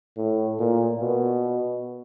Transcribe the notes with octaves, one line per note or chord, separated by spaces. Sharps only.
A2
A#2
B2